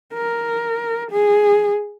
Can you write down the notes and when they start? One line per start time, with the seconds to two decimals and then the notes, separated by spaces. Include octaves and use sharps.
0.14 A#4
1.11 G#4